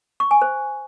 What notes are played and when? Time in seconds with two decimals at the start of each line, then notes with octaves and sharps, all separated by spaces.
0.20 C#6
0.31 G#5
0.42 C5